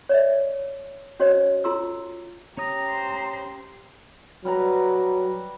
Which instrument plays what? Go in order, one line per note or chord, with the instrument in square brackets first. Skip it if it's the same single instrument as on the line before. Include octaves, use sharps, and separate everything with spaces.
[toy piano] C#5 D5 E5
C#4 F#4 C5 C#5 D#5
F4 A4 A#5 C6 E6
[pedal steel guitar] C#4 C#5 D#6 [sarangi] G4 [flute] A#5
[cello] C5
[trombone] F#3 [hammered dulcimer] G3 B4 A#5